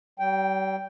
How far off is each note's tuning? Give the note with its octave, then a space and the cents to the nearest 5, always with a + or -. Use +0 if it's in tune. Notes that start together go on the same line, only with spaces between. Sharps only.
G3 -40 G5 +0